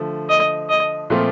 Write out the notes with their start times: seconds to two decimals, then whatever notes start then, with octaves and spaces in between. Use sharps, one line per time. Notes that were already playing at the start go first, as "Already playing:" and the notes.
Already playing: D3 F3 A3
0.29 D#5
0.69 D#5
1.10 A#2 F3 A3 C4 F4